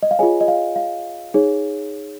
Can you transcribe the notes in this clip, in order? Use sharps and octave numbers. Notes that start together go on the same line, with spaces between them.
D#5
F5
F4 G#4 C#5 D#5 G#5
D#5
F5
F5
D#4 G#4 C#5